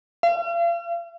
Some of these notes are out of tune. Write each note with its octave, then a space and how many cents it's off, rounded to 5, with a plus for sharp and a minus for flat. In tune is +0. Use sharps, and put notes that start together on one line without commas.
F5 -45